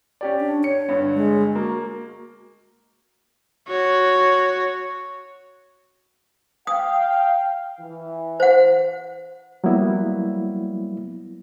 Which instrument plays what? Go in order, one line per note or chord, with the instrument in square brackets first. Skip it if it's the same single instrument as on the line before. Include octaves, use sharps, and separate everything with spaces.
[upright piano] C#4 G4 D5
[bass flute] D4
[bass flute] C#5 [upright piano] C#7
[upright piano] G2 D3
[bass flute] G#3
[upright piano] A#3 [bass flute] F#4
[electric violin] F#4 C#5
[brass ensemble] F5 G5 [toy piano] D#6
[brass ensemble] E3
[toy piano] C5 F#5
[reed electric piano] F#3 G3 A#3 B3 E4